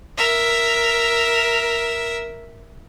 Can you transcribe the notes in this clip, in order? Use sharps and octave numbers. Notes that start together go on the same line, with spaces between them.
A#4 E5